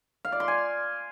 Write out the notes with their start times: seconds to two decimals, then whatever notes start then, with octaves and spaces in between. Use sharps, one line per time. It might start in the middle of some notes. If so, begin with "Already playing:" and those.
0.25 F5
0.32 D5
0.40 C6
0.48 G#5